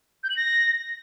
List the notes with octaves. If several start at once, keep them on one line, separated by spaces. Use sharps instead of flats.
G6
F#7
A#6